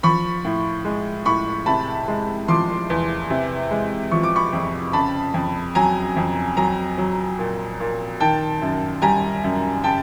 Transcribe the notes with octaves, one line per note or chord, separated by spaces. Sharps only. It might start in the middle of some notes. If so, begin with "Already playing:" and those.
F3 B5 C#6
A2
G#3
A2 B5 C#6
C3 A5 B5
G#3
F3 C6 D6
E2
C3
G#3
F3 C#6
D6
B5 C#6
F2
C#3 A5 B5
F2
F#3 G#5 A#5
F2
F#3 G#5 A#5
F#3
A#2
A#2
D#3 G5 A5
F#2
G3 G#5 A#5
F#2
C#3 G5 A5